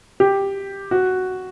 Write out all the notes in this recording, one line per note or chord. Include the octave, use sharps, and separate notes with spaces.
G4
F#4